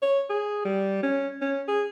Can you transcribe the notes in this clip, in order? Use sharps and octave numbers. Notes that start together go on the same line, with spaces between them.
C#5
G#4
G3
C#4
C#4
G#4